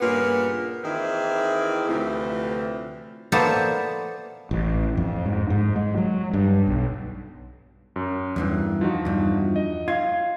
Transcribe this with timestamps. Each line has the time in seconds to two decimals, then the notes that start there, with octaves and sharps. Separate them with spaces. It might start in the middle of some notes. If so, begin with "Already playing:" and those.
0.01 G2 A#2 C#3 B3 A#4 B4
0.84 D#3 E3 A#3 C4 E4 G#4
1.88 D2 C3 E3 F3 A3
3.32 A#3 B3 A4 C5 D5 E5
4.51 A1
4.97 F2
5.26 G#2
5.50 G#2
5.76 G#3
5.98 F#3
6.33 G2
6.68 B1
7.96 F#2
8.36 E2 G2 E3
8.81 F3 D#4 F#4
9.05 E2 G2
9.56 D#5
9.88 F4 G#6